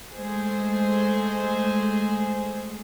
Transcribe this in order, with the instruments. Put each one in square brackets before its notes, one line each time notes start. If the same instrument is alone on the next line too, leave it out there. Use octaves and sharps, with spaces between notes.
[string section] G#3 A3 G#4 C5